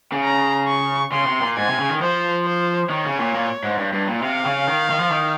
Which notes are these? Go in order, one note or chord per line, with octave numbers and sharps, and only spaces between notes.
C#3
A#5
C#6
C#3 C6
C3
A#2
G#2 G#5
C3
C#3
D#3
F3 C5
C5
D#3 C#5
C#3
A#2
A#2
G#2
G2
G2
A#2
C3 F5
C#3
D#3
D#3
F3
D#3